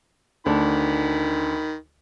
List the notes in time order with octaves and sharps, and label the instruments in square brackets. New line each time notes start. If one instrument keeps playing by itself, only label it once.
[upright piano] D2 D4 [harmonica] D#3 B5